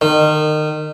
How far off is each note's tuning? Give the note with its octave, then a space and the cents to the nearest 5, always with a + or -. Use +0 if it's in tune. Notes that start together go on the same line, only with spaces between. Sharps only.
D#3 -30